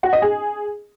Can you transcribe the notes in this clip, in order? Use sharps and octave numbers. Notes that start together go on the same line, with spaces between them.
F#4
D#5
G#4